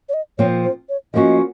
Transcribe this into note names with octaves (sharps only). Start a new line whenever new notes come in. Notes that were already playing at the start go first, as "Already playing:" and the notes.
C#5
D#5
A#2 F3 C4 C#5
C5
C#5
F3 A#3 C#4 F#4 D#5